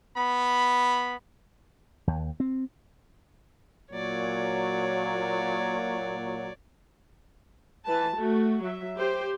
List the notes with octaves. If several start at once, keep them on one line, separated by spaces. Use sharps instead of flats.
B3 B5
D#2
C4
A#2 F#3 C#5 D5
E3 B4 A5
A3 F#4
F#3 E5
G4 C5